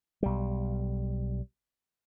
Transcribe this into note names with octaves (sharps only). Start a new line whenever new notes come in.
B1 G3